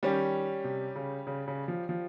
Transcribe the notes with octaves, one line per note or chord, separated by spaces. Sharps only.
D#3 G3 C#4 G4
C3
C#3
C#3
C#3
F3
F3